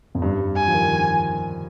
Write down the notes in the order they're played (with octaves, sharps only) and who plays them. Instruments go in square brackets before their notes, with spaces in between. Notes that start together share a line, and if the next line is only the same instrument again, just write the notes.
[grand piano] F2
G2
[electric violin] G#5
[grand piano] F3
D#3